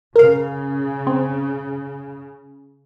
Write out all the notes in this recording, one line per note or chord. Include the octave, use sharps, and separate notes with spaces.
C#3 A#4 F5
C4